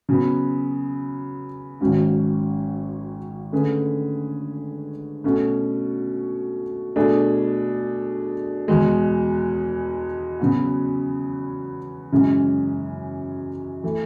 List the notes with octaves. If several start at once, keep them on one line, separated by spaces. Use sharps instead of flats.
C#3 F#3 B3
G#1 G#2 F#3 C#4 F#4
D3 A3 C#4 G#4 B4
B2 A3 C#4 F#4
B2 A3 D4 G#4
E2 B2 G#3
C#3 F#3 B3 F#4
F#2 C#3 E3 G#3 C#4
E3 A3